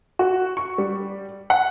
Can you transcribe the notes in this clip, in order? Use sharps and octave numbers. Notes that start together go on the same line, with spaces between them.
F#4
C#6
G3
F#5